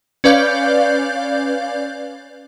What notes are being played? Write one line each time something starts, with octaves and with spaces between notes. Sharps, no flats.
C#4 B4 D5 F5 G6